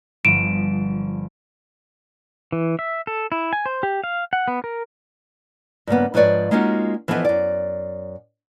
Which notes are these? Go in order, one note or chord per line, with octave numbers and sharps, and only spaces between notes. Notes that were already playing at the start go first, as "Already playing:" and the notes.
G1 F3 D7 E7
E3
E5
A4
E4
G#5
C5
G4
F5
F#5
B3
A#4
G2 C#3 A#3 B3
G#2 F3 B4 C#5 D5
G#3 A#3 C#4 D#4 F4 F#4
E3 F3 B3 A4 C5 D#5
F#2 D5